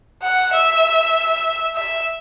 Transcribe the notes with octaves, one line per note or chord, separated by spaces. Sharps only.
F#5
E5
E5